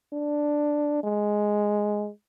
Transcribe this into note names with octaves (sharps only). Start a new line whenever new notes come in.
D4
G#3